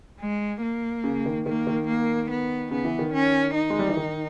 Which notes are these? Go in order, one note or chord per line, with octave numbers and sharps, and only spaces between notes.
G#3
A#3
C#3
D#3
D#3 A#3
D#3
A#3
B3
C#3 B3
E3
D#3
C#4
D#4
G#3
G3
E3
D#3